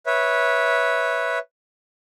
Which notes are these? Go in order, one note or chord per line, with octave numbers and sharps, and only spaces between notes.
B4 C#5 E5